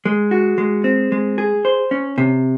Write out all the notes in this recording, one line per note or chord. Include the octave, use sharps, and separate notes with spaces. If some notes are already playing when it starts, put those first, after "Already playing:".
G#3
F#4
G#3
C4
G#3
G#4
C5
C#4
C3